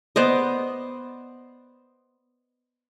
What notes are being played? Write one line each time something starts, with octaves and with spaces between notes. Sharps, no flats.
B3 C5 D5 D#5